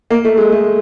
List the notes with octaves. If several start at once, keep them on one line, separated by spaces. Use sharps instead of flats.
A#3
A3
G#3
A3